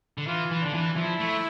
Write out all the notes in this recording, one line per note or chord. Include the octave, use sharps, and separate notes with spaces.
D3
E3 F4
E3
D3 D4
E3
F3 E4
A3